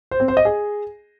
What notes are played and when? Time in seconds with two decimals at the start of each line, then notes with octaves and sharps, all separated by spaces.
0.11 C5
0.20 C4
0.28 C5
0.37 D#5
0.45 G#4